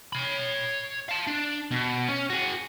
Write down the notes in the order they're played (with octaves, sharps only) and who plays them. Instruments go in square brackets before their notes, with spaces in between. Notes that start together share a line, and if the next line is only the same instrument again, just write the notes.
[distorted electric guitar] C#5 B5
F5 A5
D4
B2
C#4
F#4 G#4